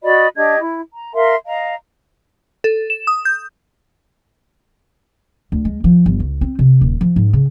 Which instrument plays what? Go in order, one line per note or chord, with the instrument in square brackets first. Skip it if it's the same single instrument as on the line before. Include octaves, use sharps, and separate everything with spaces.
[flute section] F#4 D5 D#5 B5
D4 G4 D#5 G#6
E4
A#5
A#4 E5 F5 C6
D#5 F5 A#5
[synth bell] A4
E7
D#6
G6
[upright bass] D2
G#3
F3
G1
C#2
C4
C3
D#1
F3
G#2
C#3